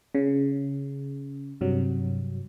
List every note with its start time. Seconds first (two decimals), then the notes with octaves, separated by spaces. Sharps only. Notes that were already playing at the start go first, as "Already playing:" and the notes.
0.15 C#3
1.61 G2 C3 F#3